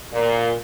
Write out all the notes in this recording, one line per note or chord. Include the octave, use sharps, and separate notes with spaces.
A#2